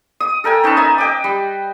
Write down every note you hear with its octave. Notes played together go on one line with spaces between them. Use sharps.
D#6
A4 A#4 G5 G#5
C#4 D#4 B4 A5
D#5 E5 G#5
D#5 G5 D6
G3